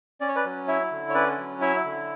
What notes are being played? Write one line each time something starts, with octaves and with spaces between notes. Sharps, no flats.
C#4 D5
C#5
B4 D5
F#3
E4 C#5 E5
D3
C#5
C#4 B4 D5
F#3
E4 C#5 E5
D3